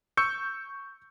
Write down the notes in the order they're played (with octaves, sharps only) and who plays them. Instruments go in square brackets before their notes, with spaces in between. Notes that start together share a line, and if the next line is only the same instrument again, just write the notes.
[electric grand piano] C#6 E6 G6 C#7